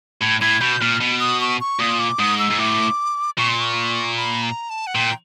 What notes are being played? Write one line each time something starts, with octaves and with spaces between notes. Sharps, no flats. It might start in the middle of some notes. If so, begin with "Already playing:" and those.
A2 G#6
A2 G#6
B2 G6
A#2 F6
B2
D#6
C#6
C#6
A#2 D#6
D6
G#2 D#6
E6
G#2
A2 D6
A#2 C#6
C6
C#6
B5
A#5
A5
F#5
A#2 G5